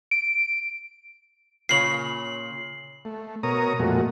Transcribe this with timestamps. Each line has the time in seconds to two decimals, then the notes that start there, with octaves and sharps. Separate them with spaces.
0.11 D7
1.69 A#2 C#3 C#5 C7 F#7
3.05 A3
3.43 B2 A#4 C#5 A#5 D#6
3.79 F2 A#2 G#3 A3 F#4